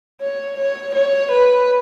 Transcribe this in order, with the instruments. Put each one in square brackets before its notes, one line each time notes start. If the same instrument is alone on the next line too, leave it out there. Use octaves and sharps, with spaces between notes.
[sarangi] C#5
C#5
C#5
B4